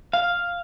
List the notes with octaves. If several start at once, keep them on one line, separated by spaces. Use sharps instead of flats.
F5